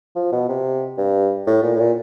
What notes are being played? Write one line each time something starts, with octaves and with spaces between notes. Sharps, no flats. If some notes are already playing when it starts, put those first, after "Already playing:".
F3
B2
C3
G2
A2
A#2
A2
A#2